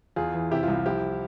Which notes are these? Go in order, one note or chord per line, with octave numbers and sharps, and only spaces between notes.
E2 F4 G#4
E3
C3 E4 G4
F4
C2
F4
F3 E4 G4